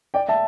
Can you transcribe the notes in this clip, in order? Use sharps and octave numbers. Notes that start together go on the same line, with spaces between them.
D5 G5
E5 A5